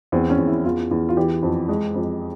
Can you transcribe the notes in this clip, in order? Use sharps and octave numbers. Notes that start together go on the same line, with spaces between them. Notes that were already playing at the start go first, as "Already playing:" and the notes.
E2 C4
C#4
E2
E4
E2 F4
E2
F4
E3 G4
F2
G#3
F2